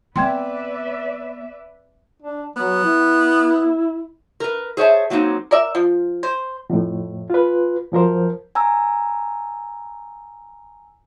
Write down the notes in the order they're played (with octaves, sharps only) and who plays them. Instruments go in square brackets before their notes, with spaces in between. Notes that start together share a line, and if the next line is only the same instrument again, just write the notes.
[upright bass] B3 [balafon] C4 G5 C6 [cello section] B4 D5 E5
[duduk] D4
[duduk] F#3 [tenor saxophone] B3
[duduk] E4
[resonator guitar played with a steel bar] A#4 B4
G#4 C5 C#5 E5 A5
F#3 A#3 C4 D#4
[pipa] A#4 D5 E5
F3
C5
[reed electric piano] F2 A2
F4 B4
F#2 F3 A#4 C5
[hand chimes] G#5 A#5 E6